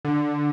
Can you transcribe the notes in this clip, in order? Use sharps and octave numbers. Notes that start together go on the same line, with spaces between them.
D3